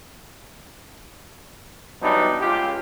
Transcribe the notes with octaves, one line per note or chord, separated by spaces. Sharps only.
E3 F#3 G3 B3 D4 D#4
C#2 F4 G4